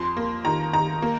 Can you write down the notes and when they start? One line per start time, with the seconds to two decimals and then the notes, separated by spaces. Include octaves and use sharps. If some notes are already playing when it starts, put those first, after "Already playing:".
Already playing: F2 C6
0.17 A#3
0.45 D#3 A#5
0.73 D#3 A#5
1.02 A#3